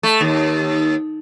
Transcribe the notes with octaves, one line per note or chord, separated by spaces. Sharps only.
A3
D#2